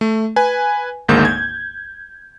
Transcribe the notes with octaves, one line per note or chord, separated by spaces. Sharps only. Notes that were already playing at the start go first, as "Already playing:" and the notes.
A3
B4 G#5
G#1 D2 G#2 G#3 A#3 G6
G#6